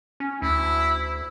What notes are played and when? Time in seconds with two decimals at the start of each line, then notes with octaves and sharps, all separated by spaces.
0.20 C#4
0.42 D2 E4